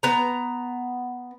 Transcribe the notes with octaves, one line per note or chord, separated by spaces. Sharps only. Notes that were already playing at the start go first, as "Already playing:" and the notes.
B3 A#5